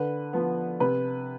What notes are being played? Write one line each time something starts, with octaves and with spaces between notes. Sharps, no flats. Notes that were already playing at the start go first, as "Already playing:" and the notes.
Already playing: D3 B4
F3 B3
C3 B4